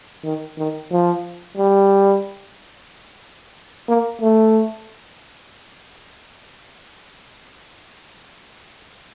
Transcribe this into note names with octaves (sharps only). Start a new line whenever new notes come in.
D#3
D#3
F3
G3
A#3
A3